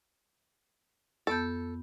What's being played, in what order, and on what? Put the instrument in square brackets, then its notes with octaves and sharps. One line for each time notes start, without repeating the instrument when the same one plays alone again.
[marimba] F2 B3 G6 [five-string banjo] A4